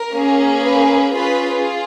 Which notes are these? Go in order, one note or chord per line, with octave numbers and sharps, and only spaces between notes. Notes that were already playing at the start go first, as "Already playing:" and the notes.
Already playing: A#4
A#3 C#4 G#4
B4
C#4 F4 G#4 B4